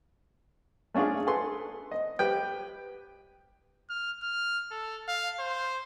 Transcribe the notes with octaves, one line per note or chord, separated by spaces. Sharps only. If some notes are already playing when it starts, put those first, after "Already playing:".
A3 C#4 D4 F4 G#4
G#4 A4 B4 C6
D#5
G4 B4 G5
F6
F6
A4
F5
C5